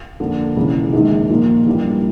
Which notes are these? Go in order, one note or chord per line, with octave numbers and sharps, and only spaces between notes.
F2 D3 F3 A#3
E1 E2 C#3
A#1 G#2 D#3 G#3
A#2 F3 A#3
A1 G2 E3 G3 A#3